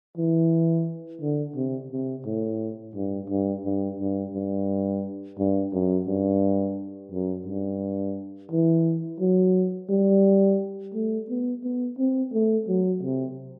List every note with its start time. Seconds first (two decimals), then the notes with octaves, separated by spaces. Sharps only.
0.18 E3
1.21 D3
1.56 C3
1.92 C3
2.26 A2
2.96 G2
3.30 G2
3.65 G2
4.00 G2
4.34 G2
5.39 G2
5.73 F#2
6.08 G2
7.12 F#2
7.47 G2
8.52 E3
9.20 F#3
9.90 G3
10.94 A3
11.29 B3
11.64 B3
11.99 C4
12.33 A3
12.68 F#3
13.03 C3